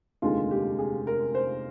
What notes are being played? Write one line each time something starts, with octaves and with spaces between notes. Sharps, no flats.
F1 D#2 D3 G#3 F4
G4
G#4
A#4
C5